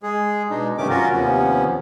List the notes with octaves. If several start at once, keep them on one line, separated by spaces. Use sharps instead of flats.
G#3 G#4
B2 G#3 D4 D#4
G2 C3 D#3 A3 C#4 D6
F#3 C#4 F4 F#4 A#4
D#2 C3 F3 B3 C#4